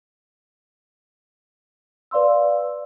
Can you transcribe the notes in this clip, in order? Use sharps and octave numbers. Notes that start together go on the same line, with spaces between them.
B4 D5 F5 C6 E6